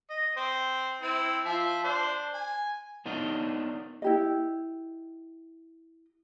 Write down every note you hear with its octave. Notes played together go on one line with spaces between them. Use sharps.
D#5
C4 C5
C4 E4
F3 E5
D4 C5
G#5
B3 D4 D#4 A#4 C#5 D#5
E4 G4 D#5